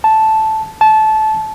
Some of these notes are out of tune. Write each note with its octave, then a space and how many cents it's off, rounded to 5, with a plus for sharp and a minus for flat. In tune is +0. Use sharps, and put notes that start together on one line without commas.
A5 -5
A5 -20